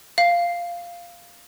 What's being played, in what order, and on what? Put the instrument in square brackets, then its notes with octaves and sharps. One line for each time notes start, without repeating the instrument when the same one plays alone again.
[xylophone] F5